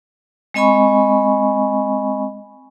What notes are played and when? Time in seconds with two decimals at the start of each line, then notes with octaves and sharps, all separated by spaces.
0.54 G#3 C4 D#5 G#5 B5 C#6